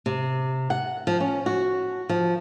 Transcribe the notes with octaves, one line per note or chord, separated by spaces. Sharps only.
C3
F#5
F3
C#4
F#4
F3